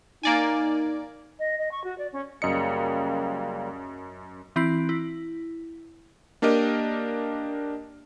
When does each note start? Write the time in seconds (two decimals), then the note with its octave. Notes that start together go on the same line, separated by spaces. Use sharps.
0.23 A#3 D#4 D5 G#5
1.39 D#5
1.58 D#5
1.71 C#6
1.84 F#4
1.98 D5
2.12 C#4
2.42 F#2 C#3 G3 A#3 D#5 C#7
4.56 E3 C4 E4 C7 D7
4.89 E4
6.42 A#3 D4 G4 A#4 D#5